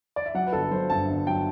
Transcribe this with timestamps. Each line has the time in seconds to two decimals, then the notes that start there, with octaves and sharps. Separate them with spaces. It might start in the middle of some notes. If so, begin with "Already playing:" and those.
0.16 D5
0.26 E5
0.34 F#3 F#5
0.47 B4
0.53 G1 A4
0.71 F#3 C5
0.90 G2 A5
1.09 G1
1.27 F#3 G5